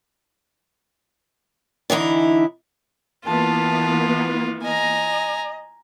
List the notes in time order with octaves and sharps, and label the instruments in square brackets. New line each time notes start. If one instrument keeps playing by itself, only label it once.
[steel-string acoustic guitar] D3 E3 D#4 E4
[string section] E3 A#3 B3 [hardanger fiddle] F4 [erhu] A5
[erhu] D#5 [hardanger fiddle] G#5 A#5